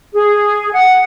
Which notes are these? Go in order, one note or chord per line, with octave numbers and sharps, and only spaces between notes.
G#4
F#5